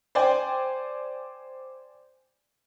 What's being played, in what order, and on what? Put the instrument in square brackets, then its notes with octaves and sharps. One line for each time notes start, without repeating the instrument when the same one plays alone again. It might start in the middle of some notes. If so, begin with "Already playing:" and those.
[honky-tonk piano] C5 D5 G5 G#5